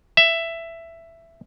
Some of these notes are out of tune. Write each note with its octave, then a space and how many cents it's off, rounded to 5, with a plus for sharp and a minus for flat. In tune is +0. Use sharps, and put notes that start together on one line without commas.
E5 +10